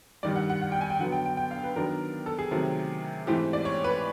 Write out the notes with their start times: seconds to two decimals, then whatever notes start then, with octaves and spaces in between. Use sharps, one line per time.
0.23 G2 D#3 G3 D5
0.36 F#5
0.50 F#5
0.62 F#5
0.72 G5
0.81 G#5
0.90 G5
0.99 D3 F#3 B3 F#5
1.12 G5
1.26 G5
1.37 G5
1.51 F5
1.63 B4
1.76 D#3 F#3 B3 D4 A#4
2.26 A4
2.39 G#4
2.51 C3 D#3 F#3 A3 C4
3.27 G#2 E3 A3 C4 G4
3.53 D5
3.65 C#5
3.84 B4